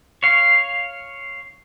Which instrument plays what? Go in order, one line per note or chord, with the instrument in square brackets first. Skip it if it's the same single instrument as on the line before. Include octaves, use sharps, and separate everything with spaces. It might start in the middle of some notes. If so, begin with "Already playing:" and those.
[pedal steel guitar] C#5 F5